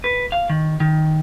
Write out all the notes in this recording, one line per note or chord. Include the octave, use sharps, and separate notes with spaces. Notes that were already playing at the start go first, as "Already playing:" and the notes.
B4
F5
D#3
D#3